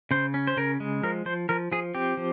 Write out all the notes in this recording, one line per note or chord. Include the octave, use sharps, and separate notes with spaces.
C#3 C5
C#4
C5
C#3 A#4
G#3
F3 A#4
F3 C5
F3 A#4
F3 G#4
C4 G4
F3